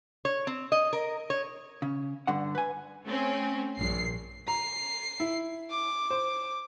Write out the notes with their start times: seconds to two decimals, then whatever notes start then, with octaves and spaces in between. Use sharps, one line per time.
0.25 C#5
0.47 C4
0.72 D#5
0.93 A#4
1.30 C#5
1.82 C#3
2.27 G2 D3 F#5
2.55 B4 G#5
3.06 A3 C4 C#4
3.78 A#1 G2 C7
4.48 A#5 C7
5.20 E4
5.70 D6
6.10 C5